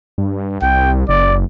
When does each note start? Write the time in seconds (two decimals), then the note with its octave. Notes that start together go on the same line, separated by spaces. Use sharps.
0.18 G2
0.62 C2 G5
1.09 F#1 D5